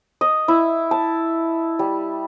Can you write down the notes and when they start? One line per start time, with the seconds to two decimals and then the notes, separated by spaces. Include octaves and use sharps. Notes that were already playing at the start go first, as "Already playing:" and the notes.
0.21 D#5
0.48 E4
0.91 A5
1.79 G3